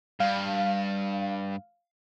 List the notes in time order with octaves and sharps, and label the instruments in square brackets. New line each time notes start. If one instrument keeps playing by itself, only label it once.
[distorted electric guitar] G2 [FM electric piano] F5